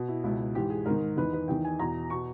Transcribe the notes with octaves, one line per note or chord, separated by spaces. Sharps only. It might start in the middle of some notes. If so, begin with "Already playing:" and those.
Already playing: B2
E4
C#2 B2 E4
G#2 E3 G4
G#4
G#2 D#3 A#4
E2 D#3 B4
B4
E2 D#3 G5
G#5
E2 B2 A#5
B2 C#6